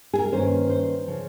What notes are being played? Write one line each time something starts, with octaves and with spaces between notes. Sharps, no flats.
G#4
A#4
G2 D#3 A#3 C#4 C5
C5
C#3 F3